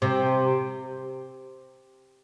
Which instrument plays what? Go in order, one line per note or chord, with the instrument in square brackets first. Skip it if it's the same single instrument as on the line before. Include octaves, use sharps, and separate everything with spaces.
[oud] C3